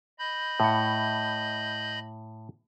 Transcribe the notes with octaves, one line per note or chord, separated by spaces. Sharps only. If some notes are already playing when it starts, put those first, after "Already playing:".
D#5 B5 G6
A2 F#5